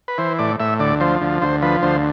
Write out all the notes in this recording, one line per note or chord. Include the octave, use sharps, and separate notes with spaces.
B4
E3 C5
A2 D5
A2 E5
D2 D5
F3 C5
D2
D2 C5
F3 B4
D2 C5